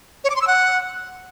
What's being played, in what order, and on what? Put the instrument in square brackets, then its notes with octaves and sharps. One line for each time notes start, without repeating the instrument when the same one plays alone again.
[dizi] C#5
D6
C6
E6
F#5